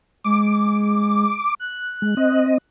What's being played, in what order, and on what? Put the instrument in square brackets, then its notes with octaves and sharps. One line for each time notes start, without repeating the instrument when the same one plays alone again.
[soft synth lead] G#3 [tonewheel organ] D6
[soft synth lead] F#6
[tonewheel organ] G#3
C4 D#5